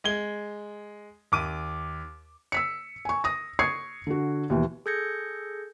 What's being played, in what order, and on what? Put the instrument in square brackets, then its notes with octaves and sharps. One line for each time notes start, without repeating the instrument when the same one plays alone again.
[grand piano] G#3 G#6 G7
D#2 D6 D#7
[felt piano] E6 B6 C#7
G#5 C#6
D#6 A#6
C#6 D#6 G#6 C7 C#7
D3 F#4
D#2 B2 E3
[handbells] G#4 A4 G6 G#6 A#6 C#7